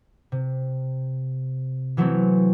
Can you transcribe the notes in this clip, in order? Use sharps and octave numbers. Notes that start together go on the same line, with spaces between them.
C3
E3 F#3 A3 B3 C4